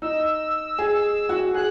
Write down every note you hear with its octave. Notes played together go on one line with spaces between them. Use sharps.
D#4 E6
G#4
F#4
G#4 F#6